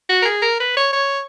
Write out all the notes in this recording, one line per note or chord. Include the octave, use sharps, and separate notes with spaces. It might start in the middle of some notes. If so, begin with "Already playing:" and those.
F#4
A#4
G#4
A#4
B4
C#5
C#5